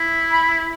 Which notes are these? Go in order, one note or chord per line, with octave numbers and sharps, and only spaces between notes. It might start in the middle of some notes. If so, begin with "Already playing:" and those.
Already playing: E4
B5